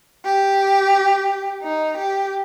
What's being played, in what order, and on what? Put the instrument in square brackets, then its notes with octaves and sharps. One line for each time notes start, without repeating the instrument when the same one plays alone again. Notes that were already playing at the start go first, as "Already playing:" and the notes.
[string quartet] G4
D#4
G4